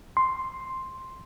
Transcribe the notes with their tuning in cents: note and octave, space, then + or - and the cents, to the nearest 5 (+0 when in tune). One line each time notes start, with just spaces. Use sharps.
C6 +5